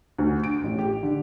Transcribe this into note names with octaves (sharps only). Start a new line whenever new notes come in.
D2
D7
A1
G4
D3